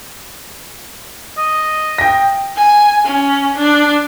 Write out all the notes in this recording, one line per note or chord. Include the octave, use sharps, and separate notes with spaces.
D#5
G5 A#6
G#5
C#4
D4